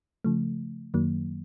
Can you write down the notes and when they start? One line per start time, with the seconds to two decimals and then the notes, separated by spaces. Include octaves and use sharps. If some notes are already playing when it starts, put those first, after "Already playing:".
0.24 C#3 F3 A3
0.94 F#2 D#3 F#3 A#3